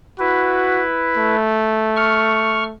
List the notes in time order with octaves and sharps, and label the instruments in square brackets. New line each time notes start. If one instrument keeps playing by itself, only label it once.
[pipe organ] E4 B4 [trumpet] F#4
[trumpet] A3
[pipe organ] C#6 F6